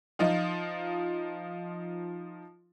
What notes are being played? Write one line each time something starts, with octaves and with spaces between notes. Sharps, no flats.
F3 D#4 F4